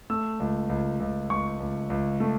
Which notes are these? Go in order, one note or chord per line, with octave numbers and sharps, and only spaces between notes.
A3 E6
C#2
C#2
C#2
C#2 C#6
C#2
C#2
A3